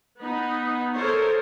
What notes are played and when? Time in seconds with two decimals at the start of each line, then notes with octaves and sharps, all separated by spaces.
0.19 B3 D#4 B5
0.93 A4 A#4 C5 C#5 D#5